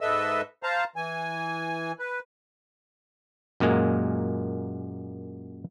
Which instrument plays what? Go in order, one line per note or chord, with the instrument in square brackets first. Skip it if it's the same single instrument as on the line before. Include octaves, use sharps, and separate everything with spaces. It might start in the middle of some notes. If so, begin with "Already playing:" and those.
[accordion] G#2 A4 B4 D#5 E5 E6
C5 F5 A5 A#5
E3 G#5
B4
[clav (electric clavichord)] F#2 A#2 G#3 A#3